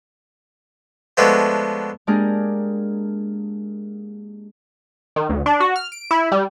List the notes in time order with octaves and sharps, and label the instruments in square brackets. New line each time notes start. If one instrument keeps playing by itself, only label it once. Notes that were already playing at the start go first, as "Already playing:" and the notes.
[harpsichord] F3 G#3 A3 B3 D4 F#4
[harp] G#3 A#3 D4 G4 G#4 A#4
[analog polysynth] D#3
D2
D4
F#4
F6
D7
E4
G3